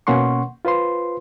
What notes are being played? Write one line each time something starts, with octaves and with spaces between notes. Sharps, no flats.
B2 A#3 C#4 F#5 C6 C#6
F4 B4 C5 C6